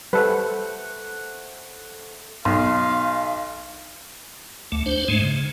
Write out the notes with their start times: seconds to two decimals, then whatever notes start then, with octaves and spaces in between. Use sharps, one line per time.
0.13 G3 A3 A4 B4 C5 F#5
2.45 B1 F5 C6
4.72 D2 A3
4.86 D4 C5
5.08 G#2 G#3 A3
5.21 C#3